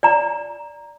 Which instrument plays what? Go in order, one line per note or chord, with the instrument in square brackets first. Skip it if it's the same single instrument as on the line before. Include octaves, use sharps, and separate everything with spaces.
[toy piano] D5 A#5